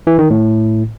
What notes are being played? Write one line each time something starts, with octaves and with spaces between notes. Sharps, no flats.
E3
D#3
A2